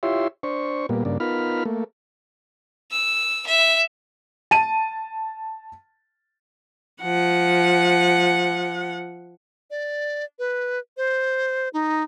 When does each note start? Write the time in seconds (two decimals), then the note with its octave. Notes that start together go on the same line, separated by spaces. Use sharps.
0.03 E4 F4 G4 C#5 E5 C6
0.43 D4 C5 C#6
0.89 A#2 G3 A#3 B3
1.05 G2 C#3 A#3 D4
1.20 B3 D#4 F4 A#4 B5 F6
1.65 A3 A#3
2.91 E6
3.47 E5
4.51 A5 D#7
7.03 F3 F#5
9.71 D5
10.39 B4
10.97 C5
11.73 D#4